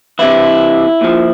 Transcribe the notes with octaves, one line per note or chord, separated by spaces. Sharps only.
C3 E3 E4
A#2 F3